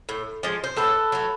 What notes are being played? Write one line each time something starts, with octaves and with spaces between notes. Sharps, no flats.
A2
F3 G#3
C5
A2 A4 B4
F#3 A3